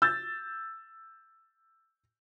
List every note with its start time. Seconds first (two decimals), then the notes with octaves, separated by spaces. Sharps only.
0.02 E6 G6 A6